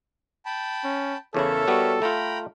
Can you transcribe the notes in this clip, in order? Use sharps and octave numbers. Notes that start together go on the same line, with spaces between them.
G5 A5 B5
C#4
E2 C#3 E4 A4 A#4 C#5 E5
G3 B3 F#4
A3 F4 G5 A#5 B5